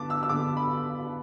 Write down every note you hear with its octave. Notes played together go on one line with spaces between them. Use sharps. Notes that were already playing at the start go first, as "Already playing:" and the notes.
Already playing: D3 B3 A5 D6
E6
E6
D3 B3 D6
B5